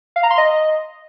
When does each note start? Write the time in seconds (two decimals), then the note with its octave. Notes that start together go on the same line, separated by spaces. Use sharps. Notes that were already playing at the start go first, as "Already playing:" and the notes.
0.16 F5
0.23 A#5
0.30 C6
0.38 D#5